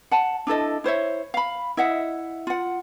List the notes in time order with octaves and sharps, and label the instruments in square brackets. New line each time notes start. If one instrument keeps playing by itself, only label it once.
[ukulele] F#5 A5
D4 E4 A4 D#5
E4 C5 C#5 E5
F5 B5
E4 D#5 E5 F#5
F4 F#5